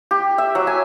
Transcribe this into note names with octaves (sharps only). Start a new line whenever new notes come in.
G4
E5
F#3
G#5